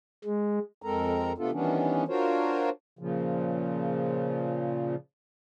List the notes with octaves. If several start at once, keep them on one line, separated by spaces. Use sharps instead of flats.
G#3
F2 G#3 C4 A4 A#4 A#5
C3 A3 B3 D4 F4 A4
D#3 E3 G3 B3 C#4 D4
D4 F4 F#4 A#4 C5 C#5
A#2 C#3 F3